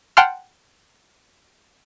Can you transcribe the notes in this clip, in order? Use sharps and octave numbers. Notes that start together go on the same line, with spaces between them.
F#5 G5 A5 C6 F6